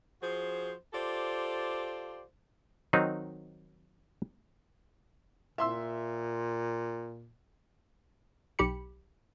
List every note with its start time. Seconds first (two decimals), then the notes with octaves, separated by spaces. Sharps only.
0.22 F3 F#4 G#4 C5
0.93 F4 G4 A4 C5 D5
2.93 D#3 F#3 C4 D#4
5.58 A#2 E5 C6 E6
8.59 B1 G4 B5 C#7